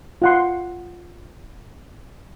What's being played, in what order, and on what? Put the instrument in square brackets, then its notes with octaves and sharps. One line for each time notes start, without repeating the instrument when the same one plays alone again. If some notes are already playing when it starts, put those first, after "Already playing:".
[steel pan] F4 F#5 C6